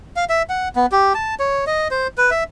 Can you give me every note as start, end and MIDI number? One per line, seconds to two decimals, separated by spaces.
0.16 0.25 77
0.30 0.42 76
0.49 0.68 78
0.76 0.86 59
0.92 1.13 67
1.15 1.35 81
1.39 1.65 73
1.67 1.88 75
1.91 2.07 72
2.18 2.31 71
2.31 2.44 76